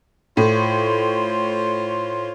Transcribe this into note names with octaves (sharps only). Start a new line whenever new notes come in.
A2 F4 C5 C#5